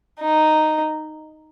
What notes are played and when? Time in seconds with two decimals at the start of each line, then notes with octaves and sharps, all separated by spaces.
0.20 D#4